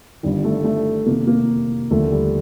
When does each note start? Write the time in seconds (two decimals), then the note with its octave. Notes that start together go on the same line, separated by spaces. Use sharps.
0.23 G1 G2 D#3 G3
0.44 A3
0.64 A3
1.06 F1 F2 D#3 A#3
1.27 A#3
1.90 D#2 D3 F3 A3
2.12 G3